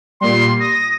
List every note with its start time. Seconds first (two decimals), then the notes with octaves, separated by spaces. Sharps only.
0.21 A#2 G3 C6
0.60 D#6 A#6